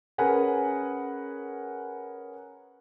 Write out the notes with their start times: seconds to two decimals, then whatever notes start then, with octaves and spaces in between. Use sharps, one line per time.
0.18 C#4 G#4 A#4 B4 F#5 G#5